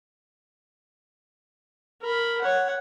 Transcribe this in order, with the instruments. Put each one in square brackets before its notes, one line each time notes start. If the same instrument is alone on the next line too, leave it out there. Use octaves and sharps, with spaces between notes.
[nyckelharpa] A#4 B5
C#5 F#5